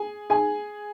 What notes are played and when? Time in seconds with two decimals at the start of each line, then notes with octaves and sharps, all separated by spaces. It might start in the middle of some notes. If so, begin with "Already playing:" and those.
Already playing: G#4 G#5
0.30 G#4 G#5